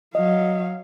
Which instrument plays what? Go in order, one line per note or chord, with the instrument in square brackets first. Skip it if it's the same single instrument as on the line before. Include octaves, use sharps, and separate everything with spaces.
[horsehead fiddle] F#3 F5 [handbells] D#5